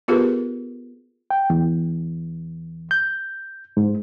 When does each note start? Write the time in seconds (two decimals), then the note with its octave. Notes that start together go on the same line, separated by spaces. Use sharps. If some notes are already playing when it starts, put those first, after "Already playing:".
0.08 B3 F4 G4 G#4 A#4 B4
1.31 G5
1.50 E2
2.91 G6
3.77 G#2